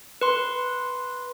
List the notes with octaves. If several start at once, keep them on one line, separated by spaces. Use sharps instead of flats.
B4 C6